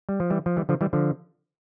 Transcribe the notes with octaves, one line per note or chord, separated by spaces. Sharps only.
G3
F3
E3 G3
F3
E3 G3
D3 F3
E3 G3
D3 F3